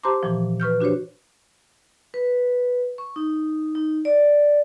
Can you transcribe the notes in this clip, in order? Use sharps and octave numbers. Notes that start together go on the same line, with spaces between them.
G4 C5 A5 A#5 C6 D6
A#2 E3 F3
B4 C#6 F6 G6
D4 F#4 G4 C5 C#5
B4
C#6
D#4
D#4
D5